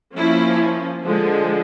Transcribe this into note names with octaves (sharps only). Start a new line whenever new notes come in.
F3 A#3 C#4 E4
D3 F3 G#3